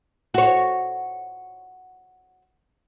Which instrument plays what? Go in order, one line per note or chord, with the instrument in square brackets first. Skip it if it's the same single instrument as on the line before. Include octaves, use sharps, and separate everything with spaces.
[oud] F#4 C#5